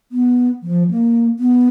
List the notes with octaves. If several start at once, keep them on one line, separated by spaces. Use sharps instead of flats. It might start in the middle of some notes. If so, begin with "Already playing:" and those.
B3
F3
A#3
B3